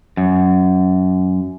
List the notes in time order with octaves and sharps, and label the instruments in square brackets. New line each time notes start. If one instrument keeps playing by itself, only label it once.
[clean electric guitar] F#2